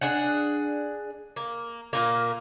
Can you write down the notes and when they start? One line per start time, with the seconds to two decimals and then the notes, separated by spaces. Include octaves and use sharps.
0.01 D4 G#4 F#5
1.36 A#3
1.93 A#2 A#3